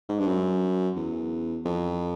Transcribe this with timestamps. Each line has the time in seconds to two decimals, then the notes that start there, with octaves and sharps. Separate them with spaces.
0.09 G#2
0.19 G2
0.27 F#2
0.96 E2
1.65 F2